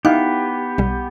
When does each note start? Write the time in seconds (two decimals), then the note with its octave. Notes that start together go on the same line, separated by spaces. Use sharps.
0.05 B3 D#4 E4 G4 F5 F#6
0.78 B1 G3